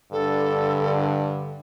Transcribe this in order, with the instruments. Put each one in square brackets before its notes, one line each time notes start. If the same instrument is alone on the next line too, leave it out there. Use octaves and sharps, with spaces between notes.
[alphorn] G2 [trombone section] D3 [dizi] A4